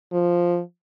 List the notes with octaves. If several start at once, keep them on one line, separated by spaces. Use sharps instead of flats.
F3